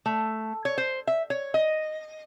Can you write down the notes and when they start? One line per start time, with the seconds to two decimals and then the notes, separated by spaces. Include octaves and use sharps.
0.06 A3
0.65 C#5
0.78 C5
1.07 E5
1.30 C#5
1.54 D#5